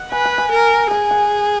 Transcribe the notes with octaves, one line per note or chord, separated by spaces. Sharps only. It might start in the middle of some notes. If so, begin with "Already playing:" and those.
Already playing: F#5
B4 G#5
G#5
G#5
A#4
G#4 G#5
F#5